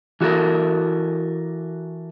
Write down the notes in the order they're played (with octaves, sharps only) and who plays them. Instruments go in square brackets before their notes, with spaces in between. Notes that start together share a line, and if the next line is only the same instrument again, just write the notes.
[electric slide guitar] E3 F#4 G4 A4 A#4